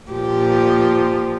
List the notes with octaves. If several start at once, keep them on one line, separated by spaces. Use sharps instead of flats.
A#2 F3 G4